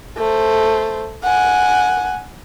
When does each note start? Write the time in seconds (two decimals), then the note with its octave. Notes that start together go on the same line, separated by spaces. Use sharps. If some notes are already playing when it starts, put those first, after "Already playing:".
0.17 A3 C5
1.23 F#5 G#5